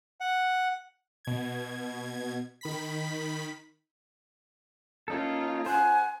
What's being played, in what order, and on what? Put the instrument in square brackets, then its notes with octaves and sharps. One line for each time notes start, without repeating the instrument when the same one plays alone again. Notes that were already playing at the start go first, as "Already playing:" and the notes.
[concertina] F#5
[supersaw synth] B2 G#6
D#3 B5 B6
[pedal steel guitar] A#3 D#4 A4 [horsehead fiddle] C#4 F4
[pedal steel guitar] C5 F#5 [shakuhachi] G#5